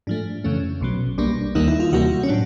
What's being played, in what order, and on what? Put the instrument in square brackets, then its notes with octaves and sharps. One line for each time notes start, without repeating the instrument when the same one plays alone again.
[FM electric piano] G#2 F3 A3 D4
F2 C#3 E3 A3 C#4
B1 B2 F#3
B1 B2 G3 A#3 D4
D#2 D#3 G3 A#3 D#4
E4
F4
D2 C3 E3 G3 A#3 F#4
C#4
A2 F#3 D4